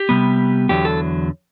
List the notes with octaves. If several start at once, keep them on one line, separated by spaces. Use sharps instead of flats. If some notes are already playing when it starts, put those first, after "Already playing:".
Already playing: G4
C3 G3 B3
E2 D3 F#3 G4
A4